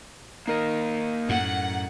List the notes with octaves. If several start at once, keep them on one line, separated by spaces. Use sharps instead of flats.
A#3 D#4 A#4 D#5
F#2 A2 F#5